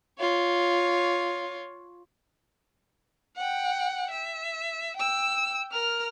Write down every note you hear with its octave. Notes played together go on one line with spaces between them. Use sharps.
F4 C#5
F#5 G5
E5
G5 E6
A#4 F6